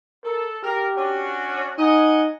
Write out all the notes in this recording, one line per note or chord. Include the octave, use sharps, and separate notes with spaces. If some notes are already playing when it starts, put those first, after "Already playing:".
A4 A#4
G4 A#4
C#4 D4 F#4
D#4 D#5 F#5 G#5